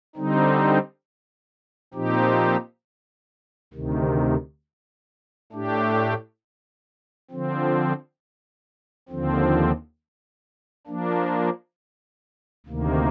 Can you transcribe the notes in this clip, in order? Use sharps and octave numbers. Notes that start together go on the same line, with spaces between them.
D3 G3 C4 D#4
A#2 F3 C4 D#4 G4
D2 C3 D#3
A2 A3 D4 G4
D3 F3 C4
D#2 D3 F3 C4
F3 A#3 D4
D2 C3 D#3 A#3